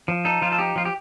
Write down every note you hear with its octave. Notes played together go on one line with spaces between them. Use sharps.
F3
D#4 A4
F3 F4
A4
D#4 G4
F3 F4
G4